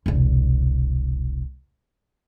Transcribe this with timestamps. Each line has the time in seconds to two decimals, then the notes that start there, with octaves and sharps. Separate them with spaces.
0.06 E1 C2